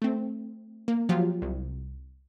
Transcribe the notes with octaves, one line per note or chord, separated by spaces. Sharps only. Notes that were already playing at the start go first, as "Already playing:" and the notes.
A3 C4
A#3
F3 F#3 F4 G4
C2